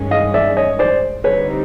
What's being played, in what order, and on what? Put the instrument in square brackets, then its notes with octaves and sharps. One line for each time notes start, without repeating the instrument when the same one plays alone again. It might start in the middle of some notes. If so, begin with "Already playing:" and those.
Already playing: [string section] G2 D#3 G#3 C#4
[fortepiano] D#5 F5
D5 E5
C#5 D#5
C5 D5
[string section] D3 G3 C4 D#4 [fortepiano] B4 C#5